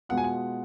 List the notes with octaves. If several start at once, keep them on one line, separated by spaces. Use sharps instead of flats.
B2 G#3 B3 F4 F#5
G#5
F#5